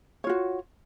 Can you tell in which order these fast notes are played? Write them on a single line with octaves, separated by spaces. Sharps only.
C#5 F4 F#4